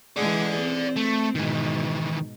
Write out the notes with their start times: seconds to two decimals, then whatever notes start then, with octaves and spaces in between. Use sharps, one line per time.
0.16 E3 G#3 G#4 D5 F#5
0.61 C4
0.97 A3
1.35 G#2 B2 D#3 E3